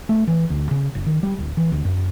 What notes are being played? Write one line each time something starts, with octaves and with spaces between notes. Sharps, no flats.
A3
E3
D2
C#3
F#1
D#3
G3
D1
E3
D2
F#2